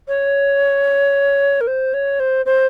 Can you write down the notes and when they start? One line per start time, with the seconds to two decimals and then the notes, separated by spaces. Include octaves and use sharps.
0.08 C#5
1.61 A#4
1.67 C5
1.94 C#5
2.20 C5
2.46 C5